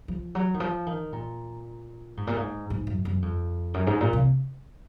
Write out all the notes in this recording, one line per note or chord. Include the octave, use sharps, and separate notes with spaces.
F3
F#3
D#3
F3
D#3
A#2
G#2
A#2
G#2
G#2
F#2
F#2
F2
F#2
G#2
A#2
C3